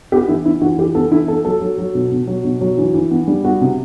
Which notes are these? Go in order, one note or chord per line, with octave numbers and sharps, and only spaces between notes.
B3 G4
E3 E4
B3 E4
E3 F#4
E3 G4
B3 A4
E3 E4
B3 A4
F#3 A4
F#3
F#3
B2
B2
F#3
B2
F#3
E3
E3
B3
G3
B3 F#4
C3